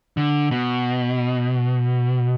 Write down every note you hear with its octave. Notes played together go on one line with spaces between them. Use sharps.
D3
B2